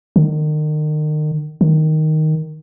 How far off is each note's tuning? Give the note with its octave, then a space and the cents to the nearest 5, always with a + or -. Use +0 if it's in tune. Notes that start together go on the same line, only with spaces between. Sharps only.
D#3 -35
D#3 +0